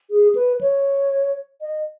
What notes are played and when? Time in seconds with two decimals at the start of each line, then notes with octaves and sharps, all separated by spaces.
0.11 G#4
0.35 B4
0.61 C#5
1.62 D#5